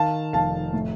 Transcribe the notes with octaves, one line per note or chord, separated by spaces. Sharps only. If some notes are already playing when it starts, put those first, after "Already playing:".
Already playing: D#3 F5 A5
F1 F5 A5
A2